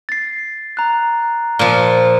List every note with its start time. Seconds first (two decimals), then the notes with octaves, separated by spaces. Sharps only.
0.09 A6 C7
0.77 A#5 F#6
1.59 A#2 F3